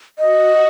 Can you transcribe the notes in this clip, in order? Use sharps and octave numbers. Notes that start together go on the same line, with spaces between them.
F#4 D#5